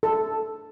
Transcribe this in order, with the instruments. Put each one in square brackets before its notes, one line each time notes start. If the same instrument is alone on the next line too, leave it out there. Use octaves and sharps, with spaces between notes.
[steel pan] A4